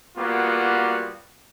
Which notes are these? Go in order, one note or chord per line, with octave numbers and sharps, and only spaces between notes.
G3 A#3 B3 F4 F#4